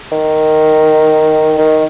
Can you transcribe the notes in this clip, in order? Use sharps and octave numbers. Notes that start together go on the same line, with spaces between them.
D#3
D#3